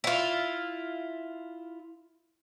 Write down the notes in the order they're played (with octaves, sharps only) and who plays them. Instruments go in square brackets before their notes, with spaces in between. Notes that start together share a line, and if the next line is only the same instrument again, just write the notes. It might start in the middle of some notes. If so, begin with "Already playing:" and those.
[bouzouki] E4 F4